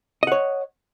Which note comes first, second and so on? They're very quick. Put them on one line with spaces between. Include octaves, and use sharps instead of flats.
D#5 F#5 C#5